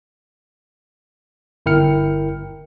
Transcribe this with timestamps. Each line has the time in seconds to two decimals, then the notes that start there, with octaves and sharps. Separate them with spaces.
1.66 G1 E4 A#4 G5 F6 C#7